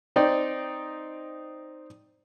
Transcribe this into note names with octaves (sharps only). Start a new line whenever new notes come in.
C4 D#4 D5 G5